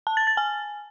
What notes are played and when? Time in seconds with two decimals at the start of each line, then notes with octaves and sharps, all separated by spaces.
0.07 A5
0.17 A6
0.27 A6
0.37 G#5